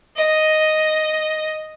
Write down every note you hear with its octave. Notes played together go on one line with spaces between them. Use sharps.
D#5